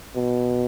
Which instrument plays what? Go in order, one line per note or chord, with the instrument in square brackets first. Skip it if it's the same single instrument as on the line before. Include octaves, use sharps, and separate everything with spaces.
[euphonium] B2